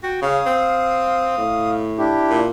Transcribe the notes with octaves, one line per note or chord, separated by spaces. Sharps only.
F#4 G5
C#3 F5 D#6
C4
A2
D4 E4 G4
A#2